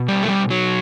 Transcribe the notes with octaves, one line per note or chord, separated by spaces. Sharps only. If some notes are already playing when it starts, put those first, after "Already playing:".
Already playing: B2
G3
A3
G3
F#3